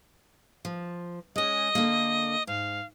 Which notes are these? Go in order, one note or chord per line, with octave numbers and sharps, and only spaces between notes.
F3
G#3 C#4 D#5
D3 A#3
G#2 F5